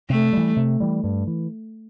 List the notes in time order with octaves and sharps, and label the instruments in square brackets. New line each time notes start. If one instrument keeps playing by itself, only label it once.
[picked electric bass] C3 [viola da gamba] A3
[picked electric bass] E3 G3
C3
E3 G3
G2
E3